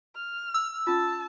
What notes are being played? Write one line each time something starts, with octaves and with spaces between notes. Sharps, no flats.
F6
E6
C#4 F4 A5